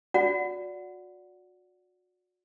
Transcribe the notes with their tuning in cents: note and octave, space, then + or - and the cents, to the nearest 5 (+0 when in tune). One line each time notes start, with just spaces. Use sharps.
F#4 -35 D5 -15 F#5 +0